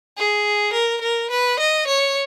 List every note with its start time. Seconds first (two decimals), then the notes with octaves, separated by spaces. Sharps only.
0.18 G#4
0.73 A#4
1.02 A#4
1.31 B4
1.59 D#5
1.88 C#5